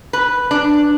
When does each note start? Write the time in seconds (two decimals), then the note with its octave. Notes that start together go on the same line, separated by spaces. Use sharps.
0.13 B4
0.51 D4